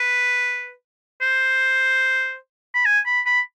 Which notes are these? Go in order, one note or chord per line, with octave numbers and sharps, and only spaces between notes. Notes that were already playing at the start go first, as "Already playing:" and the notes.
Already playing: B4
C5
B5
G#5
B5
B5